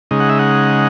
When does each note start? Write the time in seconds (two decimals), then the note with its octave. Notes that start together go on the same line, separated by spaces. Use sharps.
0.11 C#3 G#3 D#4
0.20 F#5
0.29 E5
0.39 F#5